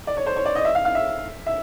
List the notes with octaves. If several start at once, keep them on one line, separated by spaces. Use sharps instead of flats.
D5
C#5
C5
C#5
D5
D#5
E5
F5
F5
E5
E5